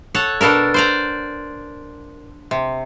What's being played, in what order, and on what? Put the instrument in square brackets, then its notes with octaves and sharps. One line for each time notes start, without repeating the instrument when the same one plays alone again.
[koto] A4 C#5 F#5
B2 D4 A4 A#4
C5 D5 A#5
C3